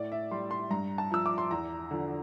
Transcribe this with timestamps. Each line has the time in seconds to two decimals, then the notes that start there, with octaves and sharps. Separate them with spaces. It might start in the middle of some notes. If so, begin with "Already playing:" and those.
Already playing: A2 D5
0.12 E5
0.31 G3 C6
0.51 C6
0.71 G2 A#5
0.98 A5
1.12 F3 E6
1.26 D6
1.38 C6
1.51 E2 A#5
1.91 D3 F3